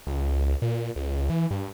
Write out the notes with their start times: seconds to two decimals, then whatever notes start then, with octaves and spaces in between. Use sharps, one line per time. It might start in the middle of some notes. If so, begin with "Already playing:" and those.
0.07 C#2
0.62 A#2
0.96 C#2
1.30 E3
1.51 G2